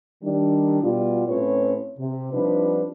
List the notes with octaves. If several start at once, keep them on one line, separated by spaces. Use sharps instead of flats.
D#3 G3 D4
B2 G3 F4
A2 C4 C#4 B4 C#5
C3
F3 G3 C4 D4 D#4 B4